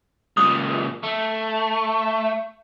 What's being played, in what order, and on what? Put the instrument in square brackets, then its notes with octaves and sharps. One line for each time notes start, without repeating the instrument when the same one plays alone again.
[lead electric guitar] C#2 A#2 [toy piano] D#6
[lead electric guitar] A3